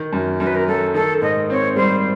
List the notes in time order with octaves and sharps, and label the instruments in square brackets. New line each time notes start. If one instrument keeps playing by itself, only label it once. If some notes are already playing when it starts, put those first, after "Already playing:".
Already playing: [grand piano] D#3
F#2
[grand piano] F#2 [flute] A#4
[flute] B4
A#4
[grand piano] F#3 [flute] A4
[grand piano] D#3 [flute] A4
[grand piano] G#2 [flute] D#5
[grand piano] C4 [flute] C#5
[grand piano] G3 [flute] C5